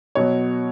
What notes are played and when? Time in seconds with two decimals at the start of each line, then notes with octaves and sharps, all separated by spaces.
0.15 B2 F#3 C#5